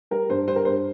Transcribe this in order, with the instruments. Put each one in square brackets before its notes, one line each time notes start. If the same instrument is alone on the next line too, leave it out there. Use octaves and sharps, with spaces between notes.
[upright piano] G3 A#4
G2 C5
G3 C5
A#4
G2 C5